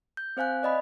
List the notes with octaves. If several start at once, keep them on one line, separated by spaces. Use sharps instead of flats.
G6
C4 C5 F5 G#5 F#6
D5 D#5 B5